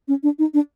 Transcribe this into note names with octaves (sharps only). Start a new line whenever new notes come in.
C#4
D4
D#4
D4